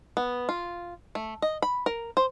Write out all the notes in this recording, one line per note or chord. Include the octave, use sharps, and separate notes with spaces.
B3
F4
A3
D#5
B5
A#4
C5